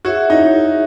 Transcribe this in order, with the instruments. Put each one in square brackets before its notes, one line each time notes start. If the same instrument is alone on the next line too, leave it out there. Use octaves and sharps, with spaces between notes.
[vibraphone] E4 G#4 C#5 E5 [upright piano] F#4
[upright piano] D#4